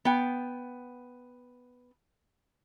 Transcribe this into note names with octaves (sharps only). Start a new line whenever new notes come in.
B3 G5